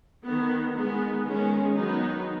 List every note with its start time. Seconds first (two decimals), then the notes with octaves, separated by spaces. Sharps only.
0.24 D#3 B3
0.74 D#3 G#3 B3
1.25 D#3 G#3 C#4
1.75 D#3 F#3 B3 D#4